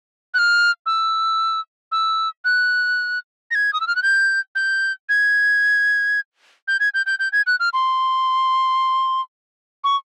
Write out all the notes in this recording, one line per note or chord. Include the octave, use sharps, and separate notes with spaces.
F#6
F6
E6
E6
F#6
A#6
G#6
D#6
E6
F6
F#6
G6
G6
G#6
G6
G#6
G6
G6
G6
G#6
F#6
F6
C6
C#6